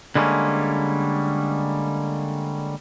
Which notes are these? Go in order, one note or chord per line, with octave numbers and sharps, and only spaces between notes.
D3 G3 G#3 A#3 C#4